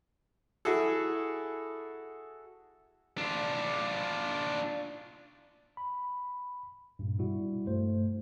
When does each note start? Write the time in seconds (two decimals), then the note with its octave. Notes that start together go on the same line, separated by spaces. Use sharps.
0.65 E4 F#4 G#4 A4
3.18 D4 F4
5.77 B5
6.99 G2 A#2
7.19 B2 G3 E4 F#4
7.67 G2 A3 C5